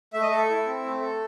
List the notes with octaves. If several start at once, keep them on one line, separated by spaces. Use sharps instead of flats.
A3 E5
D#5
A4 E5
E4
C4
A3
A4